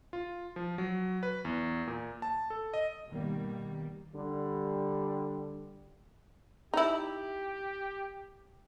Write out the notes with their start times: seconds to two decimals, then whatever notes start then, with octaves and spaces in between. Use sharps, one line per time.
0.13 F4
0.56 F3
0.78 F#3
1.23 B4
1.45 E2
1.87 A#2
2.22 A5
2.50 A4
2.74 D#5
3.10 B2 D#3 G3 A#3
4.14 D3 G3
6.74 D#4 E4 G4